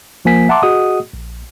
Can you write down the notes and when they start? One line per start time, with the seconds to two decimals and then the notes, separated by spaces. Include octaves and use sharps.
0.25 G1 F3 A#3 G#5 B6
0.49 E5 F#5 A5 A#5 C6 D6
0.63 F#4 G#4 D#5 F#5 D#6
1.13 A#1